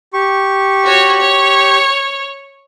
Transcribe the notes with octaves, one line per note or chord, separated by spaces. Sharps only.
G4 C#6
F#4 C#5
C#5